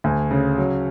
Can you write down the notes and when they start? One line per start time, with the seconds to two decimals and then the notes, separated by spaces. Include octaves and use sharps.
0.04 D2 G#5
0.31 C#3
0.58 F#3